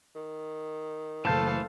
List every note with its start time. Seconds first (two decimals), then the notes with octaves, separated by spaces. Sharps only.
0.15 D#3
1.25 F#1 E3 A3 A4 C5 F5 A5 G6